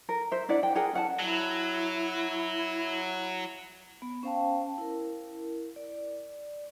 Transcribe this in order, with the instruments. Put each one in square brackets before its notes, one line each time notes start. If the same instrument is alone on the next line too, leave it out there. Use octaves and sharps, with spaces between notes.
[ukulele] A#4
C5 E5
D4 E4 D5 F#5
G5
G#4 A#4 F#5 G5
C#4 F#5 A5
[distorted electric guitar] F#3 [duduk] E4
[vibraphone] B3
C#4 C5 F5 G5 A5
E4 A#4
D5